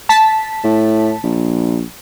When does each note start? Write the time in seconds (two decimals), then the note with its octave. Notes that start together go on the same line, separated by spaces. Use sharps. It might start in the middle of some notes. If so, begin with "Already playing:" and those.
0.09 A5 B6
0.64 A2
1.23 A#1